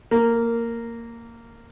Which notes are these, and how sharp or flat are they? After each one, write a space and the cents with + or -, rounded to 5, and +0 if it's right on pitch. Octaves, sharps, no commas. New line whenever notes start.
A#3 -10